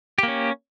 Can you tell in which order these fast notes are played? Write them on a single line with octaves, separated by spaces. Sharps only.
G4 A#3 C#4